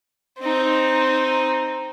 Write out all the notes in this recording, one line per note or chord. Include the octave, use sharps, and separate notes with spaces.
C4 D#4